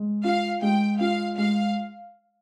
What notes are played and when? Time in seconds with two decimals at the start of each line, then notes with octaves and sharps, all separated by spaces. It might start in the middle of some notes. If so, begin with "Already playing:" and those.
Already playing: G#3
0.24 F4 F5
0.62 G#3 G5
1.00 F4 F5
1.38 G#3 F5